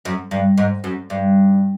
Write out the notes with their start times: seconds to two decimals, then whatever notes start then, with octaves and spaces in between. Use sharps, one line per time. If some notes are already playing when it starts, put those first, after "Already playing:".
0.05 F#2
0.31 G2
0.58 G#2
0.84 F#2
1.10 G2